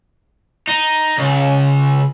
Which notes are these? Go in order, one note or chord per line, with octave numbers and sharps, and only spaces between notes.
D#4
C#2